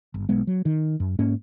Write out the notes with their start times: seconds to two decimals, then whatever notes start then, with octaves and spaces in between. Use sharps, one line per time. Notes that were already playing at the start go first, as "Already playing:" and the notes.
0.14 G1
0.29 B1 G#3 B3
0.47 F#3
0.65 D#3
1.00 F#2
1.19 G#2 A#3 C#4